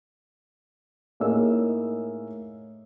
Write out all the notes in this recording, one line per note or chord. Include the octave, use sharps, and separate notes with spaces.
A2 A#3 D#4 G#4 C#5 E6